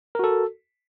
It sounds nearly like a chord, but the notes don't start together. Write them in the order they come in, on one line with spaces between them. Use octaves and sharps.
A#4 F#4 A4